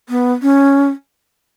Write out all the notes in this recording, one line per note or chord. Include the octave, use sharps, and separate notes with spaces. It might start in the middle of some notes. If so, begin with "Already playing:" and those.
B3
C#4